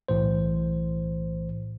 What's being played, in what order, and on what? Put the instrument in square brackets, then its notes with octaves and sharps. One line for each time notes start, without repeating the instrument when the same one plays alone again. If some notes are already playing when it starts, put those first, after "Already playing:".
[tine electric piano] B1 A2 E3 C5